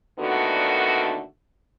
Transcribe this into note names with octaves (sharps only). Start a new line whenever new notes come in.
A#2 D3 D#3 A3 B3 F#4